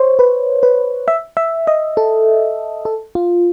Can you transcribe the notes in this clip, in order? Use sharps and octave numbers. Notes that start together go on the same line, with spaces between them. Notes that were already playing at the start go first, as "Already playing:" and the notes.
Already playing: C5 C#5
B4
B4
E5
E5
D#5
A4
A4
F4